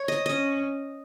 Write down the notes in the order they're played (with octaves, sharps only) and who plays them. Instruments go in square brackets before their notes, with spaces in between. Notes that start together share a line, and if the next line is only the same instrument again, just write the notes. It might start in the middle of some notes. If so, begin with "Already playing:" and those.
Already playing: [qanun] C#5
D#5
[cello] C#4 [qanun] D#5